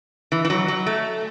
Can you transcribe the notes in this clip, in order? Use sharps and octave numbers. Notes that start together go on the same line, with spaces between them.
E3
E3
F#3
F#3
A3